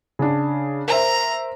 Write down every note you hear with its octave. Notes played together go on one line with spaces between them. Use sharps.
C#3 D4
A#4 C5 E5 A#5